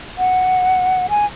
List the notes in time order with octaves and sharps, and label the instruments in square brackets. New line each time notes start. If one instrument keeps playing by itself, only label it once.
[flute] F#5
G#5